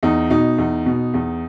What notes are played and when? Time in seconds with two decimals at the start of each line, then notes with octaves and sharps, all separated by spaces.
0.03 E2 D#4
0.30 B2 D#4
0.58 E2
0.86 B2
1.14 E2